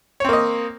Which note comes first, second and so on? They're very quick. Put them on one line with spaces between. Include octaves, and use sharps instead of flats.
C#5 C4 A#3 D#5